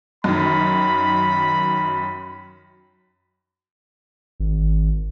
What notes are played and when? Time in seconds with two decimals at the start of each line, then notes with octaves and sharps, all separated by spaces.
0.24 F#2 D#3 B5
4.40 G#1